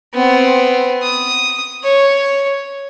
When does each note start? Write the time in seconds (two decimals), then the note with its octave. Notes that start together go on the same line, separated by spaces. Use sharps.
0.14 B3 C4
1.03 D#6
1.84 C#5